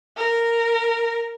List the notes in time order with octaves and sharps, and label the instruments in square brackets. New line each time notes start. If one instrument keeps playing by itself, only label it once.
[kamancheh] A#4